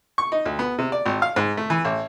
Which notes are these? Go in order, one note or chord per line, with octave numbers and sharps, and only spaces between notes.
C#6
D#4
D2
B3
C3
D5
G#1
F5
G#2
A3
E3
A1